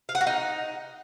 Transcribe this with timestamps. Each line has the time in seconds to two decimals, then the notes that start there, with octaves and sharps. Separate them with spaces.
0.09 F5
0.15 F#5
0.21 F#4
0.27 D#4